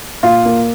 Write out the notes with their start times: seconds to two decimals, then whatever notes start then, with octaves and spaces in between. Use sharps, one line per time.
0.23 A#2 F4
0.45 A#3